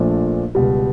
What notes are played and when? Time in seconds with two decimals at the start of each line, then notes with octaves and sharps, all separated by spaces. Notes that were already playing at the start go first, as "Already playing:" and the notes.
Already playing: A#1 A#2 F3 A3 D4
0.55 C#2 B2 G3